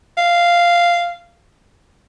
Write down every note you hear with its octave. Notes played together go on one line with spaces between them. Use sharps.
F5